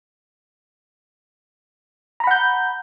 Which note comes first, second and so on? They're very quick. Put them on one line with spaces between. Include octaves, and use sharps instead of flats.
A#5 B5 F#5 G6